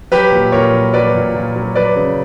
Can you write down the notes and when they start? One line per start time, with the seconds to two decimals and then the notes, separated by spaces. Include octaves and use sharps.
0.11 F#3 G4 B4
0.32 A#2
0.52 A#2 A#4 C#5
0.73 F#3
0.93 F#3 B4 D5
1.14 A#2
1.35 A#2
1.56 F#3
1.76 F#3 B4 D5
1.96 C#3